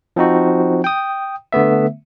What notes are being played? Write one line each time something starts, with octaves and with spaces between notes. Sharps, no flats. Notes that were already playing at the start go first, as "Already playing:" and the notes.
F3 C4 D#4 F#4
G5 D#6
D3 A3 B3 E5